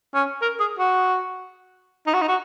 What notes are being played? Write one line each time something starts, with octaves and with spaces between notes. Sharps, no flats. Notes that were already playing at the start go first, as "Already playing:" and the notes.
C#4
A#4
G#4
F#4
D#4
F#4
D#4
F#4